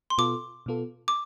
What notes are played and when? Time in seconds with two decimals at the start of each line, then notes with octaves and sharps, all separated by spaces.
0.10 C6
0.18 B2 B3 F4 A4 D6
0.66 B2 B3 F4 A4
1.08 D6